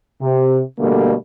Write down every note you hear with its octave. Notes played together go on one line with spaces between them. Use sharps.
C3
B2 D3 G3 A3 A#3